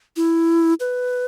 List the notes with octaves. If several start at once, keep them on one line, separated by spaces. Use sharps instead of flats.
E4
B4